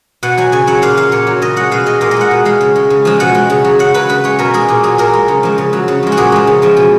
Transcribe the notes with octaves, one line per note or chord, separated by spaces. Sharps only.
B2 F#5
F#3 G#5
C#3 G#5
F#3 F#5
A#2 F5
F#3 F5
A#2 C#5
F#3
C#3 D#5
G#3 F#5
B2 F5
G#3 D#5
A#2 F5
D#5
G#3 F#5
B2
G#3 F5
C#3
G#3
C#3
F3 G#3
B2 F#5
G#3
C#3
F#3
C#3 F#5
F#3 B4
C#3 B4
G#3 C#5
B2 A#4
G#3 G#4
A#2 A#4
F#3 G#4
A#2 A#4
G#3
C#3
F3 G#3
C#3
F#3
C#3
F3 G#3
F#4
A#2 G#4
F3 G#3
C#3
F3 G#3
B2